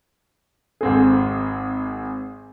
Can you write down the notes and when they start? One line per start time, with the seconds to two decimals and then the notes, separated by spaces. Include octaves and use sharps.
0.81 G#1 C4 G#4